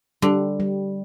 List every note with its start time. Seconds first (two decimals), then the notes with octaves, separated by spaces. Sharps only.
0.22 D3 G3
0.60 G3